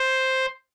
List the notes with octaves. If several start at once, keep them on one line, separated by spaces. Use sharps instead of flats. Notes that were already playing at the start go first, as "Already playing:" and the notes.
Already playing: C5